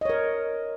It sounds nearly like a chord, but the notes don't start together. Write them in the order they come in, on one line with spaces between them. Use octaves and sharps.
D#5 C#5 A#4